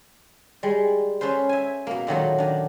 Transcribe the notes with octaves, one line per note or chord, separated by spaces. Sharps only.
G3 G#3
C#4 A4 B4 C5
E5 G#5
B2 A#3
A#2 D#3 F#3 A3
D#3 D4